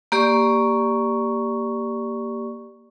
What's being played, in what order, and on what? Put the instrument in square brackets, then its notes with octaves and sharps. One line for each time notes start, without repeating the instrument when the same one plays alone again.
[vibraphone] A#3 G4 D5 C#6